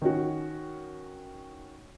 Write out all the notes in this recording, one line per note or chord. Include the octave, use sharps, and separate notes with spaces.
D#3 C#4 F#4